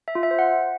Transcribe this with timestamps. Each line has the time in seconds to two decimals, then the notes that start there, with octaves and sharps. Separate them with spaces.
0.08 E5
0.15 F4
0.23 E5
0.31 C5
0.39 F#5